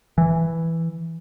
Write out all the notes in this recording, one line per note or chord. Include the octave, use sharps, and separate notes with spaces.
E3